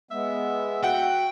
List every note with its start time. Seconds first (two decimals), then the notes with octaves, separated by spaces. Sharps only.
0.11 G#3 B3 E5
0.83 F#4 E5 F#5 G5